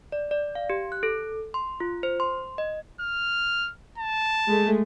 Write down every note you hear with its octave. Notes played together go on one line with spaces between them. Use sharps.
D5
D5
F5
G4
F#6
A4
C6
F4
C5
C6
D#5
F6
A5
G#3 A3